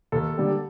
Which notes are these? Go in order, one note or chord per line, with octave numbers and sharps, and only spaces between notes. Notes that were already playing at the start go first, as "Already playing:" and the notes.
D#2 A4
D3 G3 A#3